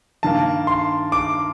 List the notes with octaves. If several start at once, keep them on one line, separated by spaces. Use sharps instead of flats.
G2 D#3 A#3 A5
C6
D6